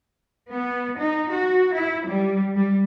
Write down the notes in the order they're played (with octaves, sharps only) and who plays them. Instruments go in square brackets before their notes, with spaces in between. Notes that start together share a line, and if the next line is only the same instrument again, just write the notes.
[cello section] B3
D#4
F#4
E4
G3
G3